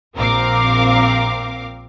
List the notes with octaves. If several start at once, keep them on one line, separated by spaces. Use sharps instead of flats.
A#1 C4 A#4 F5 D6